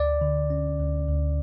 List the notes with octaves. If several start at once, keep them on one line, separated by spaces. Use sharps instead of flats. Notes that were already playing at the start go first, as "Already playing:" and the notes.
Already playing: D2 D5
D3
C#4
D2
D2